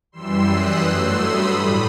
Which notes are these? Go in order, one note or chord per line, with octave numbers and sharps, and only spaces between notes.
F#2 E3 G3 C6 E6
D#6 F#6
G2 F#3 A3 C6 E6
B5 D#6
A2 G3